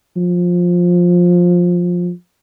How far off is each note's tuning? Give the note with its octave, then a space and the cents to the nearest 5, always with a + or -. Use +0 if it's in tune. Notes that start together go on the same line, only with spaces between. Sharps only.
F3 +15